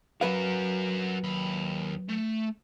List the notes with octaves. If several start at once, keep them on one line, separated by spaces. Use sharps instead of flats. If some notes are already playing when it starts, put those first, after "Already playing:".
F#3 F#4 A#4 B4 F5
D#2 B5
A3